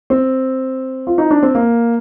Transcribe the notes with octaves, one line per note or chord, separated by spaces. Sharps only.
C4
F4
D#4
D4
C4
A#3